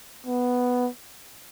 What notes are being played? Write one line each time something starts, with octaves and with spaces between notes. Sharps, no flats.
B3